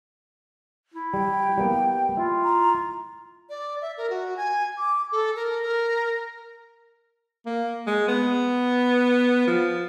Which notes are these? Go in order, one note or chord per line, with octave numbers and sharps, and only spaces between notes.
E4
G3 G5
G3 A#3 B3
E4 F4
A#5
D5
E5
A#4
F#4
G#5
D6
A4
A#4
A#4
A#3
G#3
B3
F3